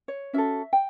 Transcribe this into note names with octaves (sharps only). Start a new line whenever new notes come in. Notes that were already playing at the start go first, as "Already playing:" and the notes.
C#5
C#4 F#4 A4 E5
G5